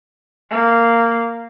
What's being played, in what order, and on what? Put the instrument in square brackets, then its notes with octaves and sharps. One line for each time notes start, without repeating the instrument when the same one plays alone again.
[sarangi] A#3